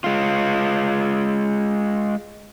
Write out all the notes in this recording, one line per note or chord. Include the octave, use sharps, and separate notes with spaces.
G#3 F4